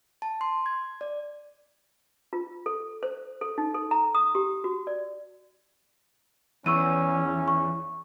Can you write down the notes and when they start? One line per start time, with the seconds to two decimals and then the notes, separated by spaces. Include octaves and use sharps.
0.22 A5
0.41 C6
0.66 G#6
1.01 D5
2.33 F4
2.66 A4
3.03 C5
3.41 A4
3.58 D#4
3.74 A4
3.91 A#5
4.15 D#6
4.35 G4
4.64 F#4
4.87 D5
6.66 E2 C#4 C#6 E6 D#7
7.48 C#6